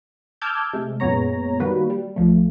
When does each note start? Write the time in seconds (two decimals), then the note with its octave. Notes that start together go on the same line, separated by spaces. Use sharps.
0.41 A5 D6 E6 F6 G6 G#6
0.73 C3 G#3 A3
1.00 F#2 A#2 G#3 B3 C#5 A#5
1.60 D#3 G3 A#3 F#4 B4
1.90 G3
2.16 B1 F3 A3